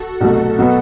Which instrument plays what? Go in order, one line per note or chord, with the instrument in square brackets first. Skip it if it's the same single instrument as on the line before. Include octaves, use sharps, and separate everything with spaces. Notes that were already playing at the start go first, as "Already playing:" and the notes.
Already playing: [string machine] F#4 A4
[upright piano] C2 B2 F#3 A3
B2 F#3 B3